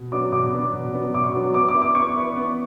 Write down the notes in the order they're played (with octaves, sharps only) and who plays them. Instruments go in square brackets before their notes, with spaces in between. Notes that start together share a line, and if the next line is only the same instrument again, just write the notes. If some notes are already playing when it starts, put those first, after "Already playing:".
Already playing: [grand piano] B2
[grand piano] F#3 B3 D4 F#4 [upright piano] D6
[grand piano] B2 [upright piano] D6
[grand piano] F#3 B3 D4 F#4
B2
F#3 B3 D4 F#4
[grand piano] B2 [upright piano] D6
[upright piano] C#6
[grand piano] F#3 B3 D4 F#4
[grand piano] B3 [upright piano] D6
[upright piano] D6
[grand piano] E4 B4 D5
[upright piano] D6
[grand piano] B3 [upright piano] C#6
[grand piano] E4 B4 D5
B3